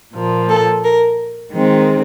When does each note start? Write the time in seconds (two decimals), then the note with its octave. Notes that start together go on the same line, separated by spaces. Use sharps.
0.13 A#2 F3 A#3
0.49 A4
0.84 A#4
1.53 D#3 G#3 C4